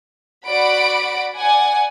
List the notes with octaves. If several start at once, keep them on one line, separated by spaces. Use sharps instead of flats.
F#4 D5 F#5 B5 D7
D5 F#5 G#5